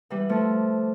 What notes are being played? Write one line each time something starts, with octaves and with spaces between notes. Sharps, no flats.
E3 G3
F3 A3